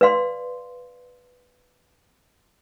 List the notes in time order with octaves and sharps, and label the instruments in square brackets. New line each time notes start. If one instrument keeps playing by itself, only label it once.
[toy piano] B4 D5 F5 C6